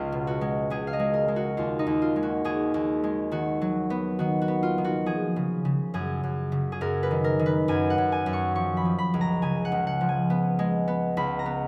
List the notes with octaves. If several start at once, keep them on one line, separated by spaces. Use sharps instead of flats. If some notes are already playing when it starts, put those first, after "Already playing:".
Already playing: C#2 F4
B2
F#4
G#3
C#2 G#4
F5
D#5
G#3
A#4
G#3
F#4
D#2 F4
D#4
D#2
F4
G#3
F#4
D#2 G#4
D#2
G#3
D#3 F#4
F#3
B3
D#3 F#4
F#4
B3
F4
D#3
F#4
F3 G#4
C#3
C#3
F#2 G#4
F#2
C#3
G#4
F#2 A#4
B4
D#3
A#4
D#3
B4
F#2 G#5
F#5
F#2
G#5
F#2
C#6
F3 C#6
B5
F3
B5
C#2
A#5
C#3 G#5
F#5
C#2
F#5
F3
G#5
B3
G#3
B3
C#2 B5
A#5
B3